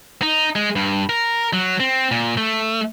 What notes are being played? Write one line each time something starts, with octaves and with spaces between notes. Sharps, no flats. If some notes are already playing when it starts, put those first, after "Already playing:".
D#4
G#3
G2
A#4
F#3
C4
A#2
A3